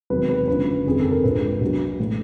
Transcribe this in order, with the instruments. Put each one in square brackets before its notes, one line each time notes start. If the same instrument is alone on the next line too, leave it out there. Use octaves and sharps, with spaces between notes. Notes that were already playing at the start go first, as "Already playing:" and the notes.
[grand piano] E1 E2 C3 D#3 F#3 B4
B4
F#1 F#2 D3 F3 B4
G1 F2 C3 D#3 G#4
A4
A#4
A#1 G#2 F3 B4
A#1 A#2 F#3
A2 E3